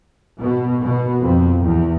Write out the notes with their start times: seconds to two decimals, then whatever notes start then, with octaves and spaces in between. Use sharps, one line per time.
0.41 B2
0.82 B2
1.24 F2
1.65 E2